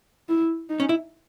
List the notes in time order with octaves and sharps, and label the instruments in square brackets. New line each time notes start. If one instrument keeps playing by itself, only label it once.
[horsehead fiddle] E4
D#4
[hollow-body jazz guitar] C#4
E4